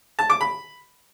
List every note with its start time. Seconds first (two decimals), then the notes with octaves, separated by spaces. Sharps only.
0.19 A5
0.30 D6
0.41 B5